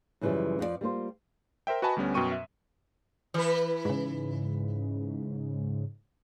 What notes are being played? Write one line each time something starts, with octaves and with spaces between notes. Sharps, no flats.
F#2 C#3 E3 F3 G3
F2 F3 G4 D5
G3 A#3 F4 C5
A#4 C5 E5 G5
F#4 B4 D#5 G#5 A5 B5
D2 G3 B3 C#4
F#2 B2 G5 C#6 D#7
E5
E3 B4
G#2 C#3